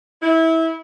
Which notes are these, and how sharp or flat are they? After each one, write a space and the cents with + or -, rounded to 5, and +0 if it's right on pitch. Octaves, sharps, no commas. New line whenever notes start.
E4 -20